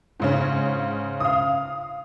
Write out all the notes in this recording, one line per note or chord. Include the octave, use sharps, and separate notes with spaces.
G#2 C#3 C#4
F5 D#6